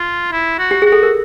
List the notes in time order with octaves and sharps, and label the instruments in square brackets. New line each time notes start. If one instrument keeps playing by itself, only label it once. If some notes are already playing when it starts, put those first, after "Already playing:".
Already playing: [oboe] F4
E4
F#4
[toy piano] G4
[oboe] F#4 [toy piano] G#4
[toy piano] A4
A#4